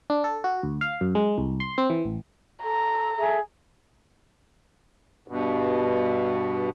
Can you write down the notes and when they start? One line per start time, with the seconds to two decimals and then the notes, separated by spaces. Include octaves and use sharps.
0.10 D4
0.24 A4
0.44 F#4
0.63 D2
0.81 F5
1.01 F#2
1.15 G#3
1.38 C2
1.60 C6
1.78 C4
1.90 E3
2.05 A1
2.63 A4 A#5
3.16 G#4 A4 E5
5.28 G2 B2